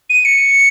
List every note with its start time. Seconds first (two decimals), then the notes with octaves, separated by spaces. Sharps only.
0.10 D#7
0.25 C#7